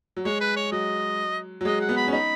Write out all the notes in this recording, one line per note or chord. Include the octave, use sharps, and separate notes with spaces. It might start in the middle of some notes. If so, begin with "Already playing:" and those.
F#3
G#3 C#5
B4
C#5
F#3 D#5
F#3
G#3 D#5
F#5
B3
B5
C#4
D#4 B5